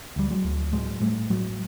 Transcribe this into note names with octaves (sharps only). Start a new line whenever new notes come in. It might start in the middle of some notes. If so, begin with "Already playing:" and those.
D2 G3
F#3 G#3
D2
A2 F#3 G#3
A2 G3 A3
A2 F#3 G#3